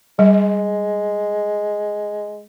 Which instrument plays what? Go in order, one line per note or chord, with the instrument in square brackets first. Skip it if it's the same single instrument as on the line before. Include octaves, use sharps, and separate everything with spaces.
[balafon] G3 [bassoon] G#3